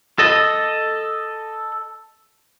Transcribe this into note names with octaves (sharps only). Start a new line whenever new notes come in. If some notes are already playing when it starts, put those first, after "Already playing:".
A4 D#5